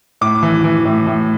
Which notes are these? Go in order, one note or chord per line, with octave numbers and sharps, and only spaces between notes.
A2 D6
E3
E3
A2
A2